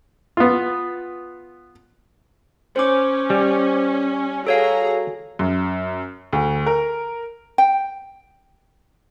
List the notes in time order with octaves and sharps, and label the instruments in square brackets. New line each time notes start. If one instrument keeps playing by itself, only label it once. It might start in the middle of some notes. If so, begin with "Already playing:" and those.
[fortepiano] B3 F4
[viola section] C#4 [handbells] C5 D6
[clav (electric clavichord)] G3
[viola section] F#4 G#4 A#5 [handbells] A4 C#5 F5
[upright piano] F#2
D2
A#4
[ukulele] G5